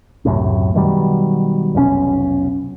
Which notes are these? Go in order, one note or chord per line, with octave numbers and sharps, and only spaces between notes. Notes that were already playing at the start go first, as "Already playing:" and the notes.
C#2 F#2 A2 C3
B2 D#3 F#3 G3
F1 B1 A2 C#4